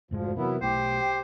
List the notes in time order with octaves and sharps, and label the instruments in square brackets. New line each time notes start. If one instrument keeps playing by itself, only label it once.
[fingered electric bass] F1 G#2 G#3 [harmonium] D2 F3
[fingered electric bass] C3 E3 [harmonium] F#3 B3 E4 [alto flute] A#4
[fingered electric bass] B1 A3 [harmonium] G4 [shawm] C5 [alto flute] G5